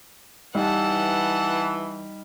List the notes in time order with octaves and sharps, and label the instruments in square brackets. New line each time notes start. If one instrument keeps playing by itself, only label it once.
[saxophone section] E3 [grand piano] G3 D#4 [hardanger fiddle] F#5 A5